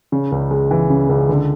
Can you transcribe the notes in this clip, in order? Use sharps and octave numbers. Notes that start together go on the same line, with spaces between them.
C#3
C#2
G#3
E3
C#3
C#2
D3